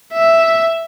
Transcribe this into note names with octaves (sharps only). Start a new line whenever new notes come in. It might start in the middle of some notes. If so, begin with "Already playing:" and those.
E5